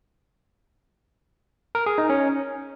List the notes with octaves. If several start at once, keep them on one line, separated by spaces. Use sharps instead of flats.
A#4
G#4
D#4
C#4